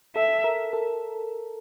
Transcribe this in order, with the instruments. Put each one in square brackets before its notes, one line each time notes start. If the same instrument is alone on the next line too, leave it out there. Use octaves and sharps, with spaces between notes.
[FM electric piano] A4 [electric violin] E5
[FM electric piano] A#4
A4